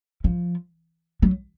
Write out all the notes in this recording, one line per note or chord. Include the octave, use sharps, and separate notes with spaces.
F3
F#3